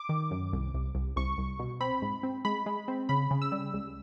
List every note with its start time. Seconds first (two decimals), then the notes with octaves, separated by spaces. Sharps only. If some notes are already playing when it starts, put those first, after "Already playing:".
Already playing: D6
0.09 D#3
0.31 F#2
0.53 C2
0.74 C2
0.95 C2
1.16 C2 C#6
1.38 C2
1.59 B2
1.80 C4 B5
2.02 G#2
2.23 C4
2.45 G#3 B5
2.66 G#3
2.88 C4
3.09 C#3 B5
3.31 C#3
3.42 E6
3.52 G3
3.74 C#2